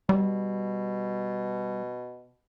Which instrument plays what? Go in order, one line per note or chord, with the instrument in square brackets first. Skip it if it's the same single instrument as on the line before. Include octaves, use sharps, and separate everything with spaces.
[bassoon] B2 [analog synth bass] G3